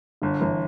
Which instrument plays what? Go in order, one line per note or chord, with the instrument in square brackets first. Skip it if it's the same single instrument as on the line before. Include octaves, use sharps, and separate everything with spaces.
[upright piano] G1 [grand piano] D3
[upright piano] G1 [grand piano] E3